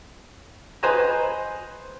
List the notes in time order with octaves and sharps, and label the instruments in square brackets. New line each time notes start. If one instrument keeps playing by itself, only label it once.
[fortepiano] B4 C5 D#5 G#5 A#5